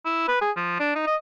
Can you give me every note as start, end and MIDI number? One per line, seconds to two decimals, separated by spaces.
0.05 0.23 64
0.28 0.37 71
0.41 0.51 68
0.56 0.78 53
0.80 0.95 62
0.95 1.04 63
1.07 1.16 75